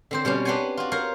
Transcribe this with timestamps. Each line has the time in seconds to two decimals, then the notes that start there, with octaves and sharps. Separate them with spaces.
0.11 D3 C4 C5
0.25 B2 G3 C4 C#4
0.45 D4 G4 B4 C5 F#5 G#5
0.77 F4 F#4
0.92 A#4 C5 C#5 F5